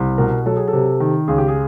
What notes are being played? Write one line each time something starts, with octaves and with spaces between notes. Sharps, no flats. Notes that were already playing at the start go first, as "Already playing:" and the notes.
Already playing: C2
B2 A#4
F#3 A4
G#4
A4
C3
D#3
C#2 G#4
G4
G#4